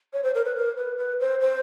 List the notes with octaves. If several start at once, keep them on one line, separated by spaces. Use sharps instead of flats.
C#5
C5
A#4
B4
A#4
B4
B4
C5
C5